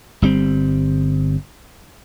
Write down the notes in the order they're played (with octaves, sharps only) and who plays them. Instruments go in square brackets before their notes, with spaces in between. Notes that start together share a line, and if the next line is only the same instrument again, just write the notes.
[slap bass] G1 G3 C4